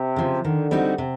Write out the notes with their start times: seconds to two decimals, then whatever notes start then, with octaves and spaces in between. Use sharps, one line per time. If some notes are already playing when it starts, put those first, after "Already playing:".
Already playing: C3
0.16 C#3 F3
0.44 D3 D#3
0.71 G3 C4 D#4 F#4
0.98 C3